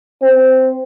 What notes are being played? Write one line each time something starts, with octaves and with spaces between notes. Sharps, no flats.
C4